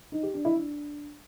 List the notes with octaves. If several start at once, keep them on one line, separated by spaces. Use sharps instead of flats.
D#4
G4
D4
E4
D4